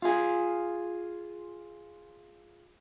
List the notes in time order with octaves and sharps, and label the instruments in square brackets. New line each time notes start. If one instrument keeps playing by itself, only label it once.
[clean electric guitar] F4 G#4